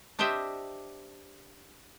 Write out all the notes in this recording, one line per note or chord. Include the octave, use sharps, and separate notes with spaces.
D4 G4 C5 D#5 E5 G5